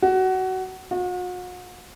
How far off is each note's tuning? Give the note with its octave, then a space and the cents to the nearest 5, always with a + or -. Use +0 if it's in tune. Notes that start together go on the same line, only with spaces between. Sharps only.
F#4 +20
F#4 -40